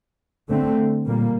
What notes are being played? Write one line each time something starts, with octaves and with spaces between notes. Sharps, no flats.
D3 A3 C4
A#2 G3 A#3